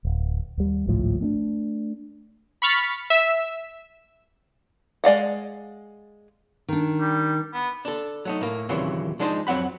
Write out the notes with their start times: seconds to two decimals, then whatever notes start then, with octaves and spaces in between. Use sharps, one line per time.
0.05 D1
0.57 D#2 G3
0.87 G#1 C#2 A2 F3
1.21 A3 B3 D4
2.62 B5 C#6 F6 A6 B6
3.10 E5 E7
5.04 G#3 D5 F5 F#5
6.69 D#3 D4
7.00 G3
7.54 B3
7.85 D4 A4
8.25 F#3 A3 D#4
8.41 A2 A#3
8.69 D#2 A#2 C#3 E3 F#3 C4
9.19 F3 G#3 D4 D#4 B4 C5
9.47 F2 F#3 C4 F#5 B5